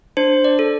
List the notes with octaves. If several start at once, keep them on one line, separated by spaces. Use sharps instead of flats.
D4 C5
D5
A4